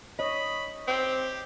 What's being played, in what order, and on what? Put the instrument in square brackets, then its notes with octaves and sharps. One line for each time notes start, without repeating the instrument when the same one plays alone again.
[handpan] C#5 D#5 [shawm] B5
[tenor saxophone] C4 [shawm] G4